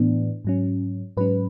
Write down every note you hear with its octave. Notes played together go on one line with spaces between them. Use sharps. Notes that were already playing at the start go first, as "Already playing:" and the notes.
Already playing: A2 E3 B3 D4
G#2 F#3 C#4
G#2 F#3 C#4 B4